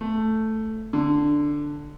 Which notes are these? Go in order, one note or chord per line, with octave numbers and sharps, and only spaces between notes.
A3
D3